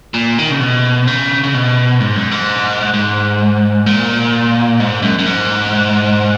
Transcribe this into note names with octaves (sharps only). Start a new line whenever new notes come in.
A#2
D#3
C#3
B2
C#3
C#3
B2
G#2
F#2
G#2
G#2
A#2
G#2
F#2
F#2
G#2